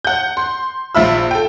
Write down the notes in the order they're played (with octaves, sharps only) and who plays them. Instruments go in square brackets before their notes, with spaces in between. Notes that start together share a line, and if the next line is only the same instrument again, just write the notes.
[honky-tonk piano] F#5 G6
C6
A#1 F4 E5 B5 E6
A4 G5